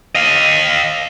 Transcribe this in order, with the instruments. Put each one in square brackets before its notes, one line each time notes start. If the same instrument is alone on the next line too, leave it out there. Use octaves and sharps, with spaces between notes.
[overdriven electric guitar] D#5 F5